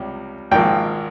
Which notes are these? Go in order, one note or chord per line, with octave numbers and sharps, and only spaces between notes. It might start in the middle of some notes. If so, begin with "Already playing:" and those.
Already playing: C#2 C3 G3
G#1 G#2 F3 A#3 G5